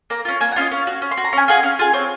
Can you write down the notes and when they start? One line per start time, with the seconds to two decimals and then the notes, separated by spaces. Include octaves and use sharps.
0.10 A#3 A#5
0.25 C#4 F4
0.41 A#3 G#5
0.52 F#5
0.56 C#4 F4 D#5
0.71 C#4 F5
0.87 F#4
1.02 C#4
1.11 C6
1.17 F#4
1.24 A#5
1.33 C#4 G#5
1.48 F4 G#4 F#5
1.63 C#4 F5
1.79 F4 G#4
1.93 C4 C#5